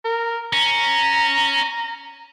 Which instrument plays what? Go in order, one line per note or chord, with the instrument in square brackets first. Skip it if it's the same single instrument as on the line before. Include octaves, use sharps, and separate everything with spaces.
[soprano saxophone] A#4
[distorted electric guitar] C#4 [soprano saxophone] A#5